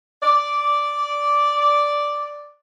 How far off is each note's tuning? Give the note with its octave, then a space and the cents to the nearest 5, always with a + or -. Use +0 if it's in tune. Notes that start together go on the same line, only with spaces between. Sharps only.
D5 -5